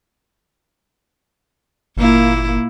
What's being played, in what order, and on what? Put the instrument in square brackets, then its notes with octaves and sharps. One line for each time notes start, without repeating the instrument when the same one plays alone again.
[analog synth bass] G1 [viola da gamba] A#2 A#3 E4